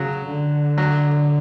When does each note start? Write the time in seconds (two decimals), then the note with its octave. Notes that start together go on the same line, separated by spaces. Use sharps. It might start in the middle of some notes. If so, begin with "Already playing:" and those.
Already playing: C#3 F#3
0.27 D3
0.78 F#3